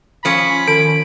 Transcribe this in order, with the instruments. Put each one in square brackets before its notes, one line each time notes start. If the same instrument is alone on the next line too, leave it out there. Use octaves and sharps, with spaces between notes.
[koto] F3 C#4 [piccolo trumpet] B5
[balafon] D#3 [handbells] D7